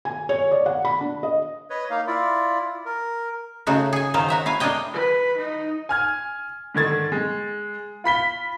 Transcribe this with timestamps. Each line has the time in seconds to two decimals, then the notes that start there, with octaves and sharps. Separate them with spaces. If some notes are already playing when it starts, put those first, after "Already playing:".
0.05 G#5
0.29 C#5
0.51 D5
0.66 F#5
0.85 B5
1.00 D4
1.23 D#5
1.70 B4 C#5 D#5
1.90 A#3 D#4 F5
2.07 E4 F4 D5
2.86 A#4
3.67 C#3 A3 D#4 F#4
3.93 G#4 G#5
4.14 D#3 F#3 D#4 F4 C5
4.28 F#4 E5 A#5
4.46 E4 F5 G#5
4.60 A3 D4 A#4 C#5 D#5 G5
4.93 B4
5.38 D#4
5.89 G#5 F6 G#6
6.75 G#2 D3 D#3 G#6 A6
7.12 G#3
8.04 F4 B5 B6 G7